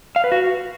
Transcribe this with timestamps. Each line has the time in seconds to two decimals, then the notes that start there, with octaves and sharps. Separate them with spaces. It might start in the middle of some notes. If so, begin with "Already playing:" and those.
0.16 F5
0.24 B4
0.32 F#4